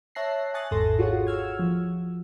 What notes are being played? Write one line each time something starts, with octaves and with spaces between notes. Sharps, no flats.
C#5 E5 A5 F#6 A#6 C7
G#5 A5 C#6 D#6 F#6 A6
G#1 E2 G#2 A4 C6 A#6
F4 F#4 G#4 C#5 F#5
C#6 E6 F6 G#6
F3